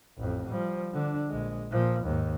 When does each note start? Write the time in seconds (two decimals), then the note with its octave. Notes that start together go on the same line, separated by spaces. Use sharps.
0.17 A1 F2
0.47 F3 G3
0.93 D3 D4
1.30 A#1 G#3
1.71 A#2 F3
2.04 D#2 G#2